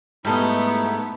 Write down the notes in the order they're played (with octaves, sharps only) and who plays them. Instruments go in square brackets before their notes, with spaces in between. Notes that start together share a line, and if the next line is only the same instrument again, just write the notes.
[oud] G#2 [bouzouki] G3 A4 D#5 [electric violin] A3 B3 [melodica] D#4 E4